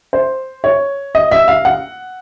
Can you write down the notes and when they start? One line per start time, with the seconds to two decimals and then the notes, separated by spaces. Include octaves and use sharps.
0.13 C5
0.64 C#5
1.15 D#5
1.31 E5
1.48 F5
1.65 F#5